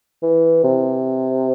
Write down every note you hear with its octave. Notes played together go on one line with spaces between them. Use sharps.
E3
C3